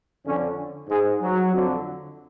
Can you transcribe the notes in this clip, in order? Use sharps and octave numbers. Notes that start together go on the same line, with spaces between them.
F2 D3 C#4
G#2 G#3
F#3
F2 D3